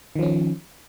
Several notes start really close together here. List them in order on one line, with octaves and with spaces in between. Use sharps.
D#3 F3 C#4